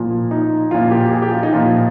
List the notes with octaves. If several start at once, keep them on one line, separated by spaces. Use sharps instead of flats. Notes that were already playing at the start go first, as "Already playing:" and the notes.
Already playing: A#2 F3
D#4
A#2 F3 F4
G4
G#4
G4
F4
D#4
A#2 F3 F4